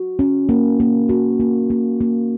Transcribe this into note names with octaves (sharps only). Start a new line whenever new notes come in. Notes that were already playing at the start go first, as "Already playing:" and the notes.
Already playing: F#4
C#4
A#3
A#3
F#4
A#3
A#3
A#3